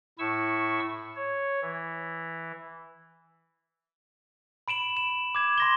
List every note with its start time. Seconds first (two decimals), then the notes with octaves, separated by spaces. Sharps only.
0.19 A2 E4 C#6 E6
1.15 C#5
1.61 E3
4.68 B5 D7 E7 F#7
4.97 E7
5.35 D6 G#6 E7
5.58 C6 A#6 G7